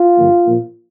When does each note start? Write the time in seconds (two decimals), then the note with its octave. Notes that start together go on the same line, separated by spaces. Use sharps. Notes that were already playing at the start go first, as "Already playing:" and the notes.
Already playing: F4
0.18 G2 D3 F3 A#3
0.46 A#2 F3 A#3